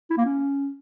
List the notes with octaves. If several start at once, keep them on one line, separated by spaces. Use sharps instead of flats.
E4
A#3
C#4